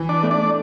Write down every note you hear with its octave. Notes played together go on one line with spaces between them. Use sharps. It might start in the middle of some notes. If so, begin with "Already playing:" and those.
Already playing: E3
D4 D5
A3
D4 D5